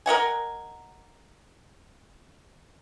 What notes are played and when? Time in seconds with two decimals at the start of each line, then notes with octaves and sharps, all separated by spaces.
0.06 A#4 D#5 F#5 G#5